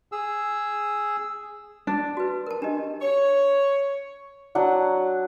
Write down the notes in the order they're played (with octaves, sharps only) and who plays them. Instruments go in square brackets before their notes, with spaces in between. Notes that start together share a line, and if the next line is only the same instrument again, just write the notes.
[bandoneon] G#4 E6
[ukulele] D4
[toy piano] F#4 B4
A#4 A5
D4 G4 D#5
[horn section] C#5
[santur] F#3 D4 F#5